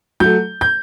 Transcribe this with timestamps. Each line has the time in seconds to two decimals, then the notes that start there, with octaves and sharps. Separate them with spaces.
0.20 F#3 A3 G6
0.61 G6